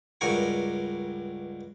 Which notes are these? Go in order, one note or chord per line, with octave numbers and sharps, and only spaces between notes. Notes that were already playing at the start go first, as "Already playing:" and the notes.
C#2 G2 F#4 A#4 G#5 C#6